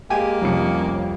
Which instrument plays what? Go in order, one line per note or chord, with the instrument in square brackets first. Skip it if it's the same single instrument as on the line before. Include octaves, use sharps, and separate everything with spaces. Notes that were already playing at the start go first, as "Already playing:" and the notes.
[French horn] G#3 [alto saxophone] A#3 [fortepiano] G4 G#5
[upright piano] C2 F2 C#7 [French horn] C#4